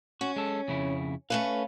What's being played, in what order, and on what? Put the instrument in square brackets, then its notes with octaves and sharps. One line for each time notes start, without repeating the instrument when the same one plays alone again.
[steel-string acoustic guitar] C#4 [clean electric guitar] F#4
[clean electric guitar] G#3 A4
F2 C#3 E4
[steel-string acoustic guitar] A3 C#4 B4 [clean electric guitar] F5